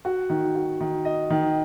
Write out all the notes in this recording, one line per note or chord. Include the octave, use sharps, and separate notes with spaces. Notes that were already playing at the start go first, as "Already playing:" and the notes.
F#4
D#3
F#4
D#3
D#5
D#3